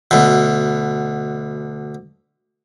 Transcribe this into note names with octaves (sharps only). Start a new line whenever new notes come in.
D2 B2